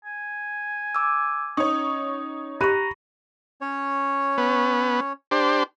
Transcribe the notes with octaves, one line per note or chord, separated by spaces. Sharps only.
G#5
D6 E6
C#4 D#4 C#5 C#6 D#6
G4 A#5 B5 C#6 F#6 D#7
C#4 C#5
B3
D4 G4 C5